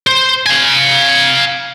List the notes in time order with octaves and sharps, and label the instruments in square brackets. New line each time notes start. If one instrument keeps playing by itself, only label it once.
[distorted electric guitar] C5
F5 G#5